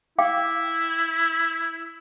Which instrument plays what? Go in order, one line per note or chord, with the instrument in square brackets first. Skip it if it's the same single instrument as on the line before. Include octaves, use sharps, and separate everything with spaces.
[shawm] E4 [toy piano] F5 G5 D6